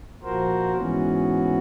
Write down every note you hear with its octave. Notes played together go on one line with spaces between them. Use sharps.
A#2 F3 F#4 A#4 C5
G#2 E3 B3 C#4 F#4